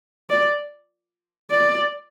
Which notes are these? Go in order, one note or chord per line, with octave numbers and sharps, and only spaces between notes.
D5
D5